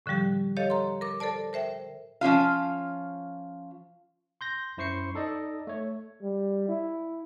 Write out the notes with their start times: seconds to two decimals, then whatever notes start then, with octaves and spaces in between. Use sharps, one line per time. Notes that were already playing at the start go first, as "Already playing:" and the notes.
0.06 A2 D3 F3 G3 G4
0.57 G4 A4 C#5 D#5 F5
0.70 A#5 C6
1.01 A#4 D6
1.20 A4 A#4 C5 D5 A5
1.53 A#4 C5 E5 G5
2.21 F3 C#4 F4 F5
4.41 C6 G6 A#6
4.77 F#2 E4 C5 C#6 C7 C#7
5.14 D#4 A4 D5 D#5
5.67 A3 C#5
6.22 G3
6.69 E4